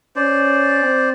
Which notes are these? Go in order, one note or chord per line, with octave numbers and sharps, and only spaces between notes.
C#4 C5 D5
C4